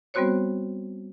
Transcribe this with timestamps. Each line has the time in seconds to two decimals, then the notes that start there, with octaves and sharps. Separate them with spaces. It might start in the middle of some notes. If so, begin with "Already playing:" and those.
0.14 G3 B3 C4 F#4 C5 C#5